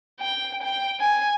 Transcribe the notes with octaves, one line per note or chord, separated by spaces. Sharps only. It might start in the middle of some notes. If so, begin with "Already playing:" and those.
G5
G5
G#5